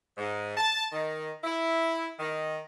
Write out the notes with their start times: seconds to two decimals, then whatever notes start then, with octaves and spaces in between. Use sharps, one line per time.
0.18 G#2
0.57 A5
0.92 D#3
1.44 E4
2.19 D#3